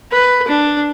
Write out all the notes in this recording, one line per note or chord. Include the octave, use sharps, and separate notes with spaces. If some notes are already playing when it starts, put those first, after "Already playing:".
B4
D4